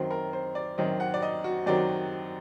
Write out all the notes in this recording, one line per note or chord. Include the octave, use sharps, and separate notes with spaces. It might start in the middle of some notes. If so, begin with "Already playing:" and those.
Already playing: F#2 D#3 F#3 C4 C5
A#4
C5
D5
F#2 D#3 F#3 C4 D#5
F#5
D5
D#5
F#4
F#2 D#3 F#3 C4 D5